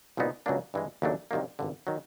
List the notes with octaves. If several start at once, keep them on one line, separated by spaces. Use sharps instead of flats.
C2 A#2 F#3 B3 D#4
C#2 C#3 F#3 A#3 D4
G2 E3 G#3
D#2 C#3 F#3 A3 D4
C2 C3 D#3 F#3 A#3
G#1 G2 D3
D#3 F#3